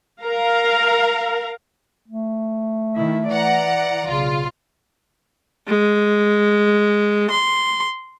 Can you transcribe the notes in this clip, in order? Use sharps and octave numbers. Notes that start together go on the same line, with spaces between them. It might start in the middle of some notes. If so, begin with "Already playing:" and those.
A#4 F5 A#5
A3
D#3 E4
E3 D5 F#5 A#5
B1 C#3 F4
G#3
C6